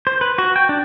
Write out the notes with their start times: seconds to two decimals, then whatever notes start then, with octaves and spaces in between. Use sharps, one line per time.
0.07 C5
0.21 B4
0.38 F#4
0.56 G5
0.69 D4